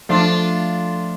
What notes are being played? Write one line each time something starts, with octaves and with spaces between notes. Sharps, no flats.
F3 A3 D4 F4